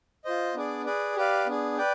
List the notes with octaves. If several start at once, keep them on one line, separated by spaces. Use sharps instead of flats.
F4 C5 D#5
B3 D4 G#4 D5
G#4 B4 D5
G4 B4 D5 F5
B3 D4 G#4
B4 D5 G5